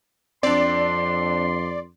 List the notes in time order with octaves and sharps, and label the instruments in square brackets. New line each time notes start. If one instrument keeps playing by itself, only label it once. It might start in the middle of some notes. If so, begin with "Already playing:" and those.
[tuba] F2 [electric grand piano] C4 D4 [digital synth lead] D5 [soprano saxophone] C6